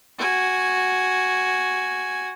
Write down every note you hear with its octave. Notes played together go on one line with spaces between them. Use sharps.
F#4 G#5